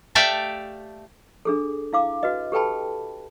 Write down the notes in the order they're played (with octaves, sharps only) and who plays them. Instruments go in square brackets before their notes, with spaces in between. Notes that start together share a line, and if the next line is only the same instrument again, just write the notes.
[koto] A3 G4 D5 E5 F5 G5
[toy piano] D4 G#4 A4
E4 F5 D6
F#4 B4 D#5
G4 A4 B4 G5 A5 B5